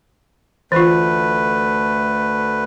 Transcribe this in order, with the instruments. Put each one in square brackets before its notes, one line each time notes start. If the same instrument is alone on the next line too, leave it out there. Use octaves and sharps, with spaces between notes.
[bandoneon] D2 A3 B4 [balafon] E3 F4